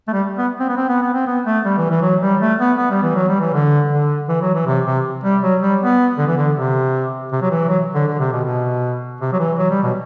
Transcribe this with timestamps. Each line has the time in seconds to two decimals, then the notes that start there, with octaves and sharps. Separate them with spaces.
0.08 A3
0.13 G3
0.38 B3
0.60 C4
0.69 B3
0.77 C4
0.89 B3
1.02 B3
1.14 C4
1.27 B3
1.46 A3
1.65 G3
1.78 E3
1.89 E3
2.02 F#3
2.21 G3
2.41 A3
2.59 B3
2.78 B3
2.90 G3
3.02 E3
3.15 F#3
3.29 G3
3.40 E3
3.53 D3
3.91 D3
4.28 E3
4.42 F#3
4.55 E3
4.66 C3
4.85 C3
5.24 G3
5.42 F#3
5.61 G3
5.80 B3
6.18 D3
6.27 E3
6.37 D3
6.56 C3
7.32 C3
7.42 F#3
7.51 E3
7.69 F#3
7.95 D3
8.07 D3
8.19 C3
8.32 B2
8.44 B2
9.21 C3
9.33 F#3
9.39 E3
9.58 F#3
9.70 G3
9.83 B2